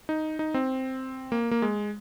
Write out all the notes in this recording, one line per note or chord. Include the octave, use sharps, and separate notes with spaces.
D#4
D#4
C4
A#3
A#3
G#3